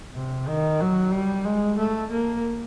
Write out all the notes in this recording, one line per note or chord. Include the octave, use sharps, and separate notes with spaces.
C3
D#3
F#3
G3
G#3
A3
A#3